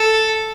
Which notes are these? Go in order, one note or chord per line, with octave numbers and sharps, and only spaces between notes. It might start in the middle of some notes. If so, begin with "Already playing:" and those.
Already playing: A4